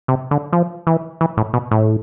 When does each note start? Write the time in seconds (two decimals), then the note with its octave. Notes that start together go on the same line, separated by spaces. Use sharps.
0.08 C3
0.31 D3
0.53 F3
0.87 E3
1.21 E3
1.37 A2
1.54 B2
1.71 A2